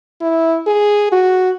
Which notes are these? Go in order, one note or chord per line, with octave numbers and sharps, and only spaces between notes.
E4
G#4
F#4